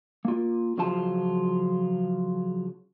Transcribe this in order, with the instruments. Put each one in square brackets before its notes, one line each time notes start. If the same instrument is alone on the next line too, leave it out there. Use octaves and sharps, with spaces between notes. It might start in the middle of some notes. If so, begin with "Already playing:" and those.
[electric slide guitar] A#3 F4
C#3 F3 F#3 F4 A5